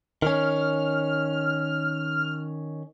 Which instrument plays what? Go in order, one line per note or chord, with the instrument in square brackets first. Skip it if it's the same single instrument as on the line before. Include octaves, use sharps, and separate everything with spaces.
[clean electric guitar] D#3 C#4 [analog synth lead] F6